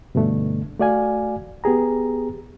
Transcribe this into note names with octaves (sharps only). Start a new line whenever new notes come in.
G2 B2 D3 A3 D4
A3 F#4 D5 F5 G#5
B3 G4 G#4 A#5